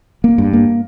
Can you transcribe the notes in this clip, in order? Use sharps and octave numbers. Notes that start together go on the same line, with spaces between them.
A#3
G2
A#3